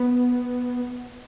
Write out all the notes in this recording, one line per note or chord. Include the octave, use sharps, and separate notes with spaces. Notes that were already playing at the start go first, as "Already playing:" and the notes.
Already playing: B3